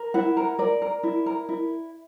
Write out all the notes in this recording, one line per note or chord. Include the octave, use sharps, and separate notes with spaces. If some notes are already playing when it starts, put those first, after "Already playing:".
Already playing: A#4
E4 F#5
A#4
A#4 D5
A#4
E4
A#4
E4